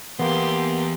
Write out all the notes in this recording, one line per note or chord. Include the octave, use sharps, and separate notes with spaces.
E2 A#3 B3 G4 C6